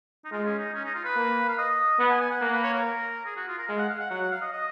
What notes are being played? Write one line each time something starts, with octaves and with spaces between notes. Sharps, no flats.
D#4
G#3 F4
C#4
D#4
C#4
D#4
F4
B4
A#3
F5
D#5
B3 F#5
G#5
G#5
F#5
A#3 F#5
B4
C#5
A#4
G#4
F#4
F4
A#4
G#3 F5
F#5
F5
F#5
F#3 F#5
F#5
F5
D#5
D#5